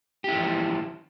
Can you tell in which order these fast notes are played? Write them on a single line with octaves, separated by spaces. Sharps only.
G4 E4 E3 F3